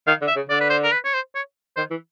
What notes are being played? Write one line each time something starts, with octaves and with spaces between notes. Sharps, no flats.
D#3 F5
D3
E5
C#3
D3 D5
B4
C5
A#4
B4
C#5
C5
C#5
D#3 C5
E3